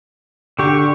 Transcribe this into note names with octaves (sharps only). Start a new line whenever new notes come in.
D3 G4 C#6